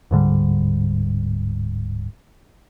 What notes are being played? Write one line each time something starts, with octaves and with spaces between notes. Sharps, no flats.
D1 G#2 D3 G3